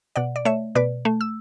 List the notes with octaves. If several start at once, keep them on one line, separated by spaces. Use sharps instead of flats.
B2 D5 F#5
D5
A3 C#5 E5
B2 B4 D5
A3
E6